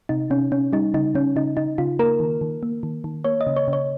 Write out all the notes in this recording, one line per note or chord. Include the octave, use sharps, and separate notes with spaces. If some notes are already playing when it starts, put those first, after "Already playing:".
C3 D#4
C3 C#4
C3 C#4
G3 D#4
C#3 D#4
C#3 C#4
C#3 D#4
C#3 D#4
C#3 F4
A#3 A#4
D#3
D#3
A#3
D#3
D#3
A#3 C#5
D#5
C#3
C#5
C#3
C#5